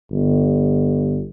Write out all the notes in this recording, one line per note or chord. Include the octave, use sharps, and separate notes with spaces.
G1